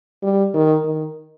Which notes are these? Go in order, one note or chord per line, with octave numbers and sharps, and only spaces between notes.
G3
D#3
D#3